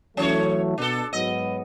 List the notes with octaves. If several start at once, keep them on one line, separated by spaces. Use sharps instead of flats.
E3 F#3 A3 C#4 C#5
B2 D4 A4
G#2 F#3 B3 D#5